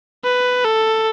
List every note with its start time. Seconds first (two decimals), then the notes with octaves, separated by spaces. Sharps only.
0.24 B4
0.64 A4